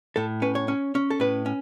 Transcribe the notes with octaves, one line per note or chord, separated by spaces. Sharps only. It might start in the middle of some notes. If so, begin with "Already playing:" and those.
A2 A4
C#4 B4
C#5
C#4
C#4
A4
A2 B4
C#4